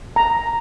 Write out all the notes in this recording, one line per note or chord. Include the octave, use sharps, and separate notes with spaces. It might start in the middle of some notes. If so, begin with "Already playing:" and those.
A#5